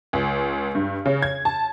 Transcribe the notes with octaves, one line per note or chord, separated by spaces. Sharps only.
C#2
G2
C#3
G#6
A5